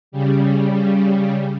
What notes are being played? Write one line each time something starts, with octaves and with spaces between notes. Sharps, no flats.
C#3 G3